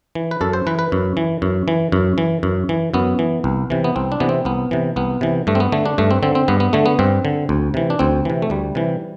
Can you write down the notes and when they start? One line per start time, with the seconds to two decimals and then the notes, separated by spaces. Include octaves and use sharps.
0.15 E3
0.31 B4
0.41 F#2 A4
0.53 C5
0.67 E3 B4
0.79 B4
0.92 F#2
1.17 E3
1.42 F#2
1.68 E3
1.92 F#2
2.18 E3
2.43 F#2
2.69 E3
2.94 F#2 B3
3.19 E3
3.44 C2
3.70 C3 E3
3.84 B3
3.96 C2 C4
4.12 D4
4.20 C3 E3 B3
4.29 C4
4.45 C2 B3
4.71 C3 E3
4.96 C2 B3
5.21 C3 E3
5.47 G2 A3
5.55 C4
5.60 B3
5.72 D3 A3
5.86 D4
5.98 G2 A3
6.11 C4
6.23 D3 C4
6.35 C4
6.48 G2 B3
6.60 B3
6.73 D3 A3
6.86 B3
6.99 G2 C4
7.25 D3
7.49 D2
7.74 C3 E3
7.90 D4
7.99 D2 C4
8.25 C3 E3
8.42 A3
8.50 D2 G3
8.75 C3 E3